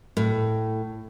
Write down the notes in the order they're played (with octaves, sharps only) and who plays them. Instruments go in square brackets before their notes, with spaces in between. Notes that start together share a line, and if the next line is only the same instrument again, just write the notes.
[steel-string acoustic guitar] A2